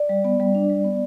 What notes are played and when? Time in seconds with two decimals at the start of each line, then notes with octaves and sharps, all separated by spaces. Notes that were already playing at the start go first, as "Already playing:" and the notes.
Already playing: D5
0.09 G3
0.25 B3
0.40 G3
0.55 D4
0.69 G3
0.84 B3